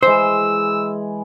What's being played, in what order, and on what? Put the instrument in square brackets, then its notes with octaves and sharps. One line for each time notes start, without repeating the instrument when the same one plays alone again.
[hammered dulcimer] E3 G#3 [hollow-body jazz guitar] C5 [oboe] E6